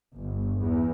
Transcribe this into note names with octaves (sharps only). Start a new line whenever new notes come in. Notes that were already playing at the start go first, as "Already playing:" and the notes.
G1
E2